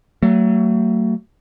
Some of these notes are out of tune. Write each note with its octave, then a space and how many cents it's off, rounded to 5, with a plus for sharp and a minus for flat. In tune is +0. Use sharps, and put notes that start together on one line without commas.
F#3 +30 A3 +35